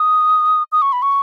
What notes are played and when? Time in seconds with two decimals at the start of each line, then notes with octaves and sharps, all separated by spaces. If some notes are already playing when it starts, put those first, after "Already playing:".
Already playing: D#6
0.72 D#6
0.82 C#6
0.92 B5
1.02 C#6